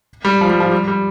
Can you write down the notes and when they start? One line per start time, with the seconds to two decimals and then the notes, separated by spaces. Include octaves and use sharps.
0.25 G3
0.41 F3
0.50 G3
0.60 F3
0.72 G3
0.88 G3